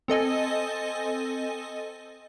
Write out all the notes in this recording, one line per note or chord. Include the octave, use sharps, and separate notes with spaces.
C4 A4 D#5 G#5